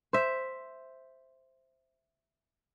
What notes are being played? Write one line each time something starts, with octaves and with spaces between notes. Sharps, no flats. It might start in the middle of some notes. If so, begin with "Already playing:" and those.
C5 E5